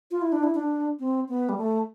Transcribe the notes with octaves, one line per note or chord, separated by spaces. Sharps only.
F4
E4
D4
E4
D4
C4
B3
G3
A3